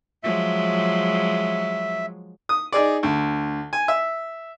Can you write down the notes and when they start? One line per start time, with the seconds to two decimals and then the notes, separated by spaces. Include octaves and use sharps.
0.23 F3 F#3 G#3 E5
2.49 D#6
2.72 D#4 G#4 D5
3.03 D2
3.73 G#5
3.88 E5